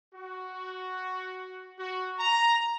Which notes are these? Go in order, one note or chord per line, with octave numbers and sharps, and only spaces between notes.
F#4
F#4
A#5